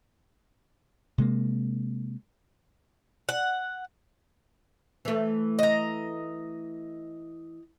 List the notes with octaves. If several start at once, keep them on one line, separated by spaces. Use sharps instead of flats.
C3 G#3 A#3
F#5
E3 A3
D#5 A#5